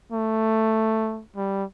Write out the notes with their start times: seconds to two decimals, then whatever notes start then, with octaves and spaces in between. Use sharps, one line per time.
0.12 A3
1.36 G3